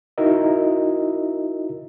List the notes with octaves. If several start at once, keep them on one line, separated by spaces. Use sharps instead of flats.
D#4 E4 F#4 A#4 D#5 E5